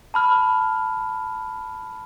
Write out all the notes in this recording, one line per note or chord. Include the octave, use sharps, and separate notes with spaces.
A5 B5 F6